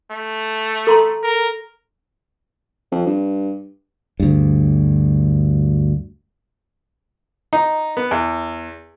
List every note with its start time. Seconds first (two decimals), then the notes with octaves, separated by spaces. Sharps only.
0.11 A3
0.87 A4 A#5 C6
1.23 A#4
2.92 F2
3.06 G2
4.20 D2 G2
7.53 D#4
7.97 B3
8.11 E2